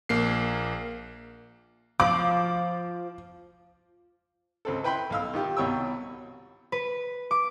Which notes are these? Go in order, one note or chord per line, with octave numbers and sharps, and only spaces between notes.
A#1 A#3 C7
F3 D6
C#2 C4 A4
E4 B4 G5 B5 C6
B1 F5 E6
D#3 F4 G4
C2 B2 C#5 G5 E6
B4
D6